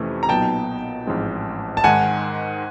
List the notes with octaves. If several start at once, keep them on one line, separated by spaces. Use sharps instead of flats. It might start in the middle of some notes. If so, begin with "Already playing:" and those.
Already playing: F2 C3 E3 A3 C#4
A#5
B1 A#2 F#3 B3 D#4 G5 A5
A1 G#2 F3 G#3 C4
A5
G#2 D#3 G#3 F#5 G#5